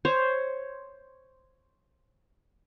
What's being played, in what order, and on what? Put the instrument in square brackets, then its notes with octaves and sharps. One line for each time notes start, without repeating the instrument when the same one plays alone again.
[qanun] C5 C#5